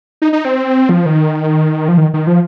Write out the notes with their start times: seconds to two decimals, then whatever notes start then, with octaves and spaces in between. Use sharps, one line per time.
0.22 D#4
0.33 D#4
0.45 C4
0.89 F3
1.06 D#3
1.88 F3
1.98 D#3
2.14 D#3
2.27 F3